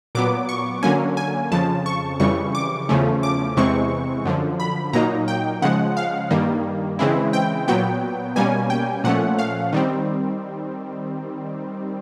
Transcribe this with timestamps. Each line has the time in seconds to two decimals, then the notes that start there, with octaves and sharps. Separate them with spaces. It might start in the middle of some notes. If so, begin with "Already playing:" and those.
0.15 A#2 F#3 B3 D6
0.49 C#6
0.83 D3 F#3 A#3 C#4 G#5
1.17 G#5
1.52 F2 C#3 F3 A5
1.86 C#6
2.20 F2 C#3 E3 G3 C#6
2.55 D6
2.89 E2 C#3 F3 A3 C#4
3.23 D6
3.57 E2 C3 E3 G#3 C4 C#6
4.25 F#2 D3 F3
4.60 B5
4.93 A#2 F#3 A#3 D#4 A#5
5.28 G5
5.62 C#3 F3 G#3 F#5
5.97 F5
6.31 G2 D#3 G3 A#3
6.99 C#3 E3 G#3 C4 E4
7.33 G5
7.68 A#2 F#3 B3 G5
8.36 B2 G3 A#3 C#4 G#5
8.70 G5
9.04 A#2 F3 A3 C#4 F#5
9.39 F5
9.73 D#3 G3 C4